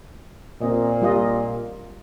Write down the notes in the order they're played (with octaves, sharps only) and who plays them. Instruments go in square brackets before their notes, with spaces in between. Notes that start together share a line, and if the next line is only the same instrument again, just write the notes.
[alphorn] A#2 [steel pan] C4 D#5
[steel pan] G3 F4 D#5